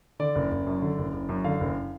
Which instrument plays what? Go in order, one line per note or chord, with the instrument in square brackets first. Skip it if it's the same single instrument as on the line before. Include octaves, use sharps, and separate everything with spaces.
[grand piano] D3 D5
F#1
F#1
F#2
D3
F#1
F#1
F#2
D3 F5
F#1